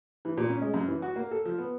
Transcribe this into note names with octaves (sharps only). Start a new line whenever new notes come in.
E3
A#2
C#4
G#3
F#2
E3
F#4
A#3
A4
F3
B3